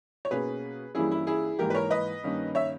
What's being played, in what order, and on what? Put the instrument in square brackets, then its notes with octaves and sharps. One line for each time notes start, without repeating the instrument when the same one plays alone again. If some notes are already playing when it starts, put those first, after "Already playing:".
[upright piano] C#5
B2 A#3 C#4 G#4 B4
G2 E3 G3 A#3 C#4 E4 G#4
E4
E4 G#4
G#2 E3 A#3 G4 A#4
B4
A#4 C#5
B4 D#5
G2 D#3 A#3 C#4
C#5 E5